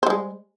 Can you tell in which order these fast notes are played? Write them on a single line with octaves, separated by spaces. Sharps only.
C5 G3 G#3